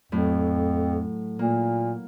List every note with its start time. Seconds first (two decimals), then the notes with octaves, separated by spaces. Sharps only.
0.12 F2 A2 F#3
1.39 A#2 A#3